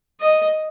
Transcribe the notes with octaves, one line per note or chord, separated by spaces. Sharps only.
D#5